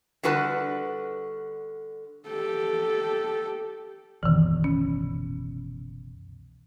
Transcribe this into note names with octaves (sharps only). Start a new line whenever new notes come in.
D3 G3 F#4 B4 A5
G4 A4
F#1 C2 B2 D#3 E3
C#4